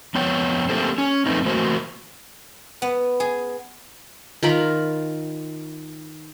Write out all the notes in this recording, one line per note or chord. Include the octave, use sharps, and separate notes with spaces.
F2 B3 C#5 G5
A3 A#3 C4 G4 A4 C5
C#4
F2 B2 A3 B3 C4 D#4
E3 A3 A#3 C4 F#4 C5
B3
G#4
D#3 F4 A#4 B5